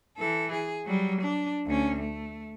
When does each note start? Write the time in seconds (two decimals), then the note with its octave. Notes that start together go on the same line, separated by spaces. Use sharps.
0.17 E3 A4
0.52 G#4
0.85 F#3 G3
1.21 D4
1.66 D2 C#4
2.00 A3